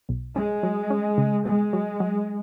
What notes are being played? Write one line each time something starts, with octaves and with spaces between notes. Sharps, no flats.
B1
G#3 C#4
F#3
C#4
C#3
B2 G#3
F#3
F#3